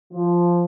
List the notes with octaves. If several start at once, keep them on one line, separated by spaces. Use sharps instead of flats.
F3